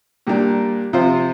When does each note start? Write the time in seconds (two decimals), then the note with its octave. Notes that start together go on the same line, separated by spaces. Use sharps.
0.27 A#2 G3 A#3 D4
0.93 C3 F3 C4 F4 C5